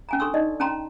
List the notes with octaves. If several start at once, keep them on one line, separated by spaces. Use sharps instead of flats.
C#4 G#5 A#5
D4 A4 C6 C#6 E6
D#4 D5 D#5
C#4 G5 A5 A#5 C6